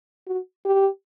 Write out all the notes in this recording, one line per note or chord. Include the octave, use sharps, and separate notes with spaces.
F#4
G4